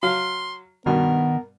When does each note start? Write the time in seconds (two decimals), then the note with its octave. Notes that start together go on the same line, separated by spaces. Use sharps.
0.03 F#3 F5 C6
0.86 G2 B2 D#3 B3 A#4